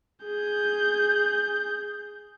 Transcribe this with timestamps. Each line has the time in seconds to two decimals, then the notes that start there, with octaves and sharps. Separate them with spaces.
0.25 G#4 G6